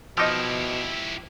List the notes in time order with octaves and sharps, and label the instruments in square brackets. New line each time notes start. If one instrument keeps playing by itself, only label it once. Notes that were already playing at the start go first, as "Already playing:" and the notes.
[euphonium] B2 [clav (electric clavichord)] F3 D#4 [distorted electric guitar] E4 G4 [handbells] D#5 D6 E6